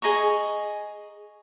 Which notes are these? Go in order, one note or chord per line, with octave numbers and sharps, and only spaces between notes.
G#4 D#5 A#5 C#6